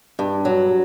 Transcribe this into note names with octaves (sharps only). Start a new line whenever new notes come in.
G2
F#3